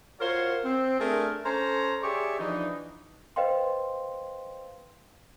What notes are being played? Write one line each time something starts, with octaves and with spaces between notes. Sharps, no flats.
F4 F#4 A#4 C5 C#5
C4
A3 D4 G#4 A#4
C#4 A4 C5 A#5
G4 G#4 C#5 D5 E5
E3 F3 D4 D#4
B4 C5 D#5 F5 G5 C6